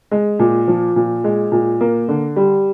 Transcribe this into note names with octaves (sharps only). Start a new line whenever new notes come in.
G#3
A#2
F3
A#2
G#3
A#2
A#3
D3
G3